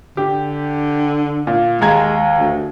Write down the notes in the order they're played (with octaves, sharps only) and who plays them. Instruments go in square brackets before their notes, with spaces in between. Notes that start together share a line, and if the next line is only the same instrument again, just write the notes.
[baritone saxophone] D3 [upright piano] G4
[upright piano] A#2
[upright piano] D#2 A#5 G#6 [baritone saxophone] G#3
[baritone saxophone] D2